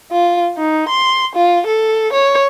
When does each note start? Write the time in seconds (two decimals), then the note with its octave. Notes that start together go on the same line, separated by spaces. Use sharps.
0.12 F4
0.58 D#4
0.88 C6
1.35 F4
1.67 A4
2.13 C#5